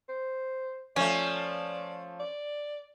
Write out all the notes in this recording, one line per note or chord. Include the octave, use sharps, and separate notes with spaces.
C5
F3 A3 C#4 D5
D5